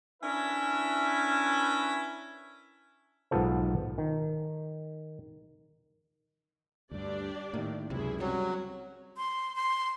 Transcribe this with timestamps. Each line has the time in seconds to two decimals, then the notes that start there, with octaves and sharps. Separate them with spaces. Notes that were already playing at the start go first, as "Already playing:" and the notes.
0.22 C#4 D4 E4 A#4 B4 E5
3.31 B1 G#2 B3 F4 A4 C5
3.98 D#3
6.91 D2 G2 D4 G4 D5
7.54 A2 D#3 A#3
7.90 C#2 F#2 C3 E4 G#4
8.20 F#3 G3 C4 C#4 F#4
9.17 C6
9.56 C6